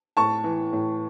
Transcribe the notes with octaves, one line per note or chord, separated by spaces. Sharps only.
A2 A5 C#6
E3
A2